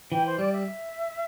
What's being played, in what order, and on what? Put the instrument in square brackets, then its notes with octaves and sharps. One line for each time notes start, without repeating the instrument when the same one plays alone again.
[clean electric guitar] E3 [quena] G5
[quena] C5
[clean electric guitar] G3 [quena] D5
[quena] E5